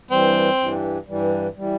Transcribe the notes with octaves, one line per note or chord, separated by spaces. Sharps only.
G2 E3 G3 C4
G2 E3 G3
G2 E3 G3
E3 G3